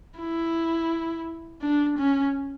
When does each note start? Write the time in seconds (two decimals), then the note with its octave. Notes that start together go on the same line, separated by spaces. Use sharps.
0.19 E4
1.62 D4
1.98 C#4